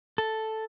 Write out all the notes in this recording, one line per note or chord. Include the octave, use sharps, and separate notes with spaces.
A4